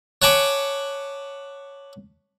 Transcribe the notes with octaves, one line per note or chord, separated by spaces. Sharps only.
C#5 F#5 G#5 A5 B5 D6